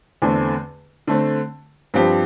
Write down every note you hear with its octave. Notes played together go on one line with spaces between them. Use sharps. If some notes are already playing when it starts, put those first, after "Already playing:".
E2 D3 A3 C4
D3 A3 C4
G2 F3 C4 G4